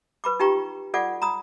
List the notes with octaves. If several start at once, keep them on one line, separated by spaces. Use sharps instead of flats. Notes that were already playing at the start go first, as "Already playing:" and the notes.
B4 B5 D6
D#4 F4 G4 G5 A#5 C#6
F4 A4 D5 F#5 G#5 D6
A#5 B5 D#6